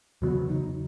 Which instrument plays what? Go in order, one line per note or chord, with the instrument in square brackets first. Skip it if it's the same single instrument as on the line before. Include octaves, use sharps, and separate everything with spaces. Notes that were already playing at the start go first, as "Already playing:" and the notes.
[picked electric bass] E2 C#3 F#3 B3 [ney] F#4
[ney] D#4